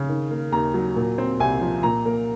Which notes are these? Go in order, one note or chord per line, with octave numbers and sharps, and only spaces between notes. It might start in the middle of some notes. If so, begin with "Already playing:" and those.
Already playing: C#3
D#3
A#3
D#2 A#5
F#3
A#2
C4
C2 G#5
F3
A#2 A#5
A#3